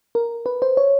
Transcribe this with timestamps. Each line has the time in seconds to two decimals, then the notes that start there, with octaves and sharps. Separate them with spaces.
0.15 A#4
0.46 B4
0.62 C5
0.77 C#5